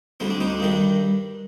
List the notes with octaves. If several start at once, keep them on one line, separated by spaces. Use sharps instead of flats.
D2 D3 G3 C4
D4
C4 D#4
D4
G2 D#3 G3